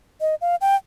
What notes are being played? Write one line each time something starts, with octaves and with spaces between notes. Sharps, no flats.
D#5
F5
G5